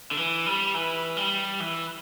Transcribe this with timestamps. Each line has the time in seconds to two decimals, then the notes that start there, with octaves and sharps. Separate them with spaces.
0.11 D3
0.17 E3
0.46 G3
0.75 E3
1.17 G3
1.60 E3